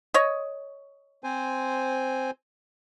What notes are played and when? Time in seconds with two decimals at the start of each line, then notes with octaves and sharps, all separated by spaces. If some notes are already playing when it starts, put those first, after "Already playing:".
0.14 C#5 D#5
1.24 C4 C5 G#5